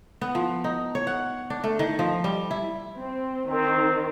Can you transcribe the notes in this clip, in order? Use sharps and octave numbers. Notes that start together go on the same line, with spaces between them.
B3
F3
D#4
C#5
F#5
D4
A3
D#3
F3
G3
E4
C4
D#3 C4